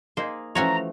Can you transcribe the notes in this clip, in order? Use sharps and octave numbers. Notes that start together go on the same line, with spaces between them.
A#3 D#4 G#4 C5
E3 F3 A3 C#4 F#4 C#5 A#5